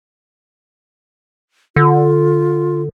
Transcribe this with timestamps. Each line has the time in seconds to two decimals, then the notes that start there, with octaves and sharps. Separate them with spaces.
1.76 D3 F4